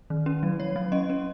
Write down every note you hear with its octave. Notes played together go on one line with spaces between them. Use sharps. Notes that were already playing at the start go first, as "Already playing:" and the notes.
D#3
C#4
F#3
F#3 C#5
F#3
C#4 D#5
C#4